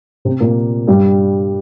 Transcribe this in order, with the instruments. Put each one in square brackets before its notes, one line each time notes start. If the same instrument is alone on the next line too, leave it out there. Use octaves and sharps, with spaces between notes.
[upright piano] C3 C4
A#2 A#3
G2 G3